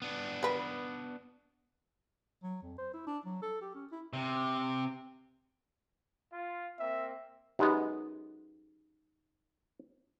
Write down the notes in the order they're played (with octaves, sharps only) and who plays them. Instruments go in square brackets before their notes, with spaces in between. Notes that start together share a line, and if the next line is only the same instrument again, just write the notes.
[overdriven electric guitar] B3 D4
[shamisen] A#4 B4
[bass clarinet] F#3
F2
C5
E4
D4
F#3
A4
G4
C#4
E4
[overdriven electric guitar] C3
[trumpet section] F4
[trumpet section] A#3 C4 [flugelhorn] E5
[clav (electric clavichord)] F#2 G#3 B3 [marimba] D#4 G4